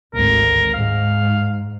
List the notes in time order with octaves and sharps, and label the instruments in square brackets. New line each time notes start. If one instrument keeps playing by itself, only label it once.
[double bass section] G#1 D2 [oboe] A#4
[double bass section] G#2 [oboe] F5